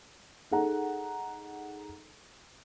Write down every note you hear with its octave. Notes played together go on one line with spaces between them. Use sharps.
D#4 G#4 A4 F#5 A#5